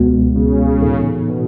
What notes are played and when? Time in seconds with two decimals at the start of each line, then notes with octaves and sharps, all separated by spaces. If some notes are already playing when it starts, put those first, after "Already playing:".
Already playing: C#2 B2 G#3 B3 F#4
0.35 C#3
0.81 A2 E3 B3 D#4 A4
1.29 B2